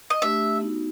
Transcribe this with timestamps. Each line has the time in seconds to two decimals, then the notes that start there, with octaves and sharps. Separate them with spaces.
0.10 D#5
0.22 A3 D4 G4 E5
0.61 B3 D#4 F#4